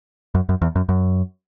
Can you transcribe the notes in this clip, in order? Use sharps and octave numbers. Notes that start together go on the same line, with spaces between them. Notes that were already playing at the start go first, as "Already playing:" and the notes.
F#2
F#2
E2
F#2
F#2